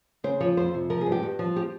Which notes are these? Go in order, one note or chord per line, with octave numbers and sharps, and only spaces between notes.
C#3 C5
F3 C#5
F2 C5
C3
F3 A#4
G#4
G2
G4
G2
F3
G4